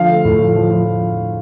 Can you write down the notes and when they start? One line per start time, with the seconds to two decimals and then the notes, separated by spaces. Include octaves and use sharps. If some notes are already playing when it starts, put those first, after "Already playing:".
Already playing: D3 F3 F5
0.09 A3
0.25 A2
0.41 F3
0.56 F3
0.71 F3